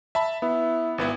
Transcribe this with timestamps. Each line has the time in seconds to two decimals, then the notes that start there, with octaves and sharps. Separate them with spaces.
0.15 E5 A5 B5
0.42 B3 E4
0.98 G#1 B3 E4